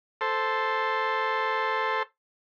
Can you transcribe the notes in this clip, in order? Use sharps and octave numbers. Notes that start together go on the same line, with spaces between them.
A4 C5